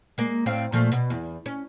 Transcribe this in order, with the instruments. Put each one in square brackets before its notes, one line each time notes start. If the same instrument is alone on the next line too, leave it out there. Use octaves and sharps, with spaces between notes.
[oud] G#3 A#3
A2 C4 F5
A#2 F3 A3
B2
E2
C#4